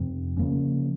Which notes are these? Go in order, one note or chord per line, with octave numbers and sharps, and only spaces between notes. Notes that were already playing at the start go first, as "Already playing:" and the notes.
Already playing: F2 C3 F3 C4
C#3 F3 A#3 C#4